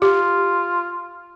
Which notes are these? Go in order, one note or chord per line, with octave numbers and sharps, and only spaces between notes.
F4 G4